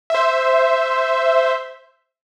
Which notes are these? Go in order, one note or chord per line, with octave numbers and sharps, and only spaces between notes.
C5 E5